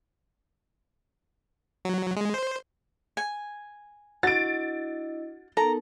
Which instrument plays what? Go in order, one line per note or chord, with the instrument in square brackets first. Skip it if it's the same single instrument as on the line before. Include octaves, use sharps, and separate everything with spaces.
[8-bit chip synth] F#3
G#3
C5
[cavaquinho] G#5
[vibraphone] D4 E4 D#5 [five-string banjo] F#4 [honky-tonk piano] A6 D7
[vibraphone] B3 D#4 A#4 [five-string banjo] A4 [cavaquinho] A#5